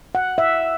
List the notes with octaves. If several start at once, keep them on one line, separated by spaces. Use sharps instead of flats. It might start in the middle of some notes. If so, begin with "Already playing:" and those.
F#5
E5